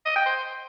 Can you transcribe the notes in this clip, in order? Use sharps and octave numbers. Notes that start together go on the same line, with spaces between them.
D#5
G5
C5